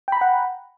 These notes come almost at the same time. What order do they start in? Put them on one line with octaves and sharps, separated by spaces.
G5 B5 A#5 F#5